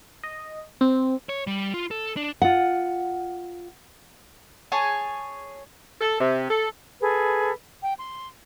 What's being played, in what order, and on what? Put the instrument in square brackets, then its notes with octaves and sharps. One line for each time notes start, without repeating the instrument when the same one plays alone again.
[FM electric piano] D#5
C4
[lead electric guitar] C#5
G3
F4
A4
D4
[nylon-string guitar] F4 F#5
[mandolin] G#4 C#5 G#5 A5
[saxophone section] A4
C3
A4
[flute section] G#4 A4 B4
G5
C6